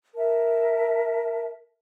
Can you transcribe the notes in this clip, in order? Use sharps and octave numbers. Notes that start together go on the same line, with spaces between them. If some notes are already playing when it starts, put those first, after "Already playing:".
A#4 E5 A5